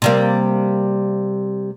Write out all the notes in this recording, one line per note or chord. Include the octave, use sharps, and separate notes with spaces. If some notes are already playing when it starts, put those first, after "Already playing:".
C3 G3 A#3